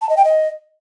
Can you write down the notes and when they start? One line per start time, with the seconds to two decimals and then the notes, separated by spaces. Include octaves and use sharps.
0.02 A5
0.09 D#5
0.17 G5
0.25 D#5